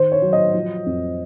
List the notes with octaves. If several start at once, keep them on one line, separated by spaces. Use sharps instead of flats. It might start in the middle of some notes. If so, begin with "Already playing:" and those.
Already playing: D#3 C5
C#5
F#3
D#5
F3
F2